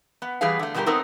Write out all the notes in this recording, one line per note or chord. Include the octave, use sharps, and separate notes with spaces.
B3
E3 G3 B3 G#4 B4 F5
D3 A3
B2 D3 G3 A3 G4 A#4
B3 C4 D#4 A4 A#4 C5